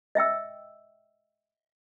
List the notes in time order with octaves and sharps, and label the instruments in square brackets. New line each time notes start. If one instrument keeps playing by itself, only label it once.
[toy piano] D#5 E5 G5 E6